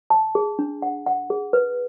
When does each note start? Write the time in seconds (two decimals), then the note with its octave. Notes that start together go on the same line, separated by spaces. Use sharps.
0.10 A5
0.35 G#4
0.59 D4
0.82 F#5
1.06 F#5
1.30 G#4
1.53 B4